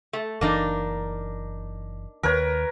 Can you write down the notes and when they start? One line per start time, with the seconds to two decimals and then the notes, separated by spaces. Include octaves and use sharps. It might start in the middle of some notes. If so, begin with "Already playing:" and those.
0.13 A3
0.41 F#1 E3 A#3 D4 D#4
2.23 D#2 D#3 A#4 B4 C#5